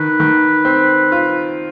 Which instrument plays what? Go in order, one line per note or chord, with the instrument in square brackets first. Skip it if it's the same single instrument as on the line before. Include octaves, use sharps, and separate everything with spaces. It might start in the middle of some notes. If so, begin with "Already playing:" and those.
Already playing: [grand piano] D#3 [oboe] B4
[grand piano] D#3
C4
F4